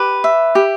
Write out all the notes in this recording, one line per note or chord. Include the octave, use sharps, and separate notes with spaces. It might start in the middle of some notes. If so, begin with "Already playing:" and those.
Already playing: G4 B4
E5
G4